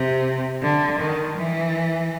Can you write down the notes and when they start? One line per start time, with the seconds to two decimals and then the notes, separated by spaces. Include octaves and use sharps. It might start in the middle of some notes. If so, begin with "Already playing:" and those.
Already playing: C3
0.62 D3
1.00 D#3
1.37 E3